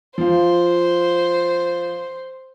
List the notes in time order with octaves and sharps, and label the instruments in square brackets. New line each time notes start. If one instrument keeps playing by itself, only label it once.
[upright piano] F3 F5 [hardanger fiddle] C5